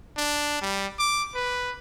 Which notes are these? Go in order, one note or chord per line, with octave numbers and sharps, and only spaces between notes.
D4
G3
D6
B4